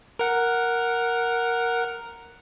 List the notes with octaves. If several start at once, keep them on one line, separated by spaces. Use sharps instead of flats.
A#4 F#5